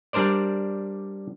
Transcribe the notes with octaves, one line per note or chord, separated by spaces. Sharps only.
G3 D4 A#4 C5 D5